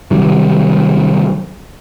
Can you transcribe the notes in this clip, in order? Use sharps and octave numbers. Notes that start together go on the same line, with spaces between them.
C3 D#3 F#3 G3